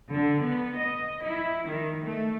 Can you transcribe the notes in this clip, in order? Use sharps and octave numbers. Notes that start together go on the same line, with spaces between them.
D3
B3
D#5
E4
D#3
A3